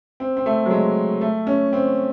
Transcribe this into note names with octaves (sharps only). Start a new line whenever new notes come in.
C4
C4
A3
F#3
G#3
A3
C#4
C4